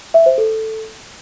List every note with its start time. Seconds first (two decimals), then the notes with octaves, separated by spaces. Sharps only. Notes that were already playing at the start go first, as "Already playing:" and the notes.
0.14 E5
0.26 C5
0.38 A4